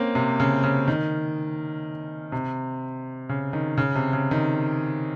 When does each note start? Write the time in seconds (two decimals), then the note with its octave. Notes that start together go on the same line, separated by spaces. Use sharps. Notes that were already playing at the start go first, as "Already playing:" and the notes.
Already playing: A#3 C4 C#4
0.15 C3
0.40 C#3
0.64 C#3
0.88 D#3
2.32 C3
3.29 C#3
3.53 D#3
3.77 C#3
3.95 C3
4.13 C#3
4.31 D#3